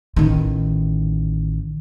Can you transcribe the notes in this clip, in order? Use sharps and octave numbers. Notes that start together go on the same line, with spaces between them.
A1 D#3